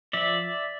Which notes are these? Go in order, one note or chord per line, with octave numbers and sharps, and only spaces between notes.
F3 D5 E5